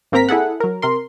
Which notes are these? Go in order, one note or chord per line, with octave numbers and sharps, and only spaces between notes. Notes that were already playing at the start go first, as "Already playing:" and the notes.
G#1 A#3 C4 A#4 A#5 B6
E4 G#4 A4 F#5
F#3 A#4
C3 A#4 C6